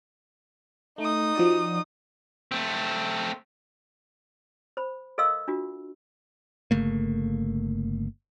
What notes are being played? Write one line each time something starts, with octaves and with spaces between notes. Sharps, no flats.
A3 D#4 D#6
F3 F#4 D5
A3 C4
C5 B5
A4 A#4 D#5 F5 C6 E6
D4 F4 F#4
G1 C#3 A3 A#3